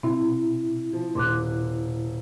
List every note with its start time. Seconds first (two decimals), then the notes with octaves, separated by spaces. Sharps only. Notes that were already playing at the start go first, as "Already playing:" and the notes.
0.03 B2 C4 E4
0.93 F3
1.15 D#1 C6 D6 F#6